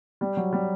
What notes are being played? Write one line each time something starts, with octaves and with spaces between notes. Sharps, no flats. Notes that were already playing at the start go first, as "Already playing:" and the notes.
G3
F#3
G3